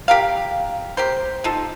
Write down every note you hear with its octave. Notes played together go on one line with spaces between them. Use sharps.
G4 A#4 F5
G4 A#4 C5
D#4 F4 A4